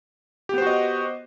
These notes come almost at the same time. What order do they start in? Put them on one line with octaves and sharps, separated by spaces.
G4 B3 C5 F#4 D#5